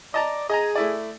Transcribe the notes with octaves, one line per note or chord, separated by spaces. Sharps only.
D5 D#5 A5 A#5
G#4 D#5 G#5 A#5
A3 E4 D5